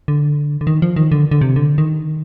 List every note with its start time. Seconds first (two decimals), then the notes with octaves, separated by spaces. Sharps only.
0.08 D3
0.61 D3
0.67 D#3
0.82 F3
0.96 D#3
1.12 D3
1.31 D3
1.41 C3
1.56 D3
1.78 D#3